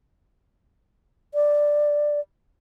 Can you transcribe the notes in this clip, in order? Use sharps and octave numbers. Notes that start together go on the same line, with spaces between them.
D5